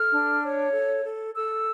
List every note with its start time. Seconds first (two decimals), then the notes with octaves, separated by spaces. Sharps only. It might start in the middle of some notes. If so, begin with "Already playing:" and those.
Already playing: A4 F6
0.10 D4
0.42 C#5
0.72 A4
1.04 A4
1.35 A4 E6